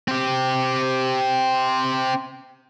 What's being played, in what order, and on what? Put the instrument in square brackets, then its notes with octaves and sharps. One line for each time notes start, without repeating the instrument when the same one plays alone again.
[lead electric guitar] C4 G4